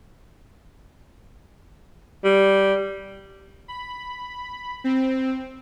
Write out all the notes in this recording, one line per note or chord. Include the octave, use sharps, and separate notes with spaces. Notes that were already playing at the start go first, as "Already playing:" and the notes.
G3
B5
C4